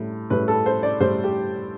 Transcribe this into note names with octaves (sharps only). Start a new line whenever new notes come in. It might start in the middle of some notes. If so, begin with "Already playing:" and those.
Already playing: A2 G3
A2 G3 B4
A4
C5
D5
A2 G3 C5
G4